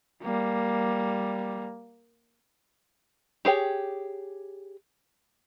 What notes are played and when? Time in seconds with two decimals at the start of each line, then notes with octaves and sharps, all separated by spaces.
0.22 G3 A#3
3.45 G4 G#4 C#5 G5